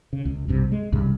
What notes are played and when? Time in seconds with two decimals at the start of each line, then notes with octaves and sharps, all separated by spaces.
0.13 C#3
0.25 C#2
0.48 B1 G2 C3
0.72 G#3
0.92 C2 G2 C#3